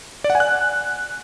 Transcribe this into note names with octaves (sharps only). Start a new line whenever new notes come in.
D5
F#5
G#5
F#6